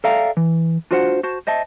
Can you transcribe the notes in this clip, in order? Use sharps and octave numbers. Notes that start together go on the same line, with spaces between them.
A4 D5 E5 F5 G5 A#5
E3
D4 F4 F#4 C5 F5 F#5
F#4 C5 A5
C5 D#5 E5 A5